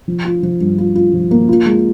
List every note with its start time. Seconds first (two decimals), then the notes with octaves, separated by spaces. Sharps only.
0.08 F3
0.25 F4
0.43 F3
0.61 G2
0.78 F4
0.95 F4
1.13 F3
1.31 A#3
1.49 F4
1.66 G#3